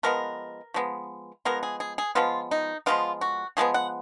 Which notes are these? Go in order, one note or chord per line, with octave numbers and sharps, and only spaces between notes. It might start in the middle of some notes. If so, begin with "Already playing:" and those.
F3 G#3 B3 A#4
F3 G#3 B3
F3 G#3 B3 A#4
G#4
G#4
G#4
F3 G#3 B3 F4
D#4
F3 G#3 B3 F4
F#4
F3 G#3 B3 G#4
F#5